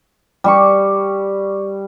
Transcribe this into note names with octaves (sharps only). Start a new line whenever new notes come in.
G3 G4 C#6